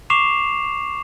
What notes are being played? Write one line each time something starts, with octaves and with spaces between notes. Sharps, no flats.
C#6 D6 C7 E7 F7